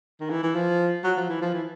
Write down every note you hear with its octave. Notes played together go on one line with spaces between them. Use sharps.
D#3
E3
E3
F3
F#3
F3
E3
F3
E3